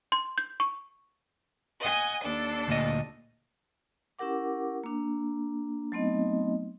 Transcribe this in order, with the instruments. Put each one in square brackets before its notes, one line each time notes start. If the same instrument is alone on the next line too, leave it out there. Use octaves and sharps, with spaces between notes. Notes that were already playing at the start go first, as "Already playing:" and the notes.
[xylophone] C6
G6
C#6
[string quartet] D#5 F#5 G#5
D#2 D4 A4
[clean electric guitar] D2 A#2 D#5
[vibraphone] C#4 E4 G4 A#4 F#5 D6
A#3 D4
F#3 A3 B3 C4 D#4 D#5